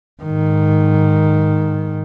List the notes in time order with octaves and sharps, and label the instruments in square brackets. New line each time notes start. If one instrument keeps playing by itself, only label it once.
[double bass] G#2 D#3